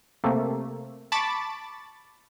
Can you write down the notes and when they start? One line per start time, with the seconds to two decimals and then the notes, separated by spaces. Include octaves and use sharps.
0.24 C3 A3 A#3
1.12 A5 B5 C#6 D6 A6